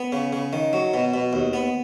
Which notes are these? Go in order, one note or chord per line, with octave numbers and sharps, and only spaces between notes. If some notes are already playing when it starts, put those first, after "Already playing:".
Already playing: B3
C#3
C#3
D#3
F#3
B2
B2
D#2
B3